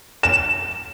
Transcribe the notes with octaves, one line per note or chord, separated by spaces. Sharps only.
E7